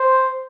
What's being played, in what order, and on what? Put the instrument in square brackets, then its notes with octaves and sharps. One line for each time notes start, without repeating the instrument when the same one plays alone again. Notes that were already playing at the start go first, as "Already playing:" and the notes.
Already playing: [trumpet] C5